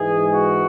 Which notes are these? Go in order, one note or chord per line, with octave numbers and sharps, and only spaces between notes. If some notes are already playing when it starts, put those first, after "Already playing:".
Already playing: G#2 E3 G#3 G#4
F#4